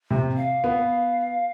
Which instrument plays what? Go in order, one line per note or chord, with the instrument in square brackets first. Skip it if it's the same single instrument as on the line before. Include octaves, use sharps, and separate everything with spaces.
[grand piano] C3
[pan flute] F5
[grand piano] B3